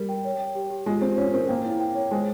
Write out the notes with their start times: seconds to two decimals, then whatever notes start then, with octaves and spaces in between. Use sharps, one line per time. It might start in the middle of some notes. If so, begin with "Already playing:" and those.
Already playing: G3 A#4
0.09 G5
0.25 C#5
0.39 G5
0.55 G4
0.70 G4
0.86 G#3 F4
1.01 C4 F4
1.17 C#4 F4
1.33 C4 A#4
1.48 A#3 G5
1.65 E4
1.80 G5
1.95 C#5
2.11 G#3 C5